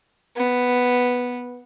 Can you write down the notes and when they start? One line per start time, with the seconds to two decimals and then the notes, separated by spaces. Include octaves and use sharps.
0.37 B3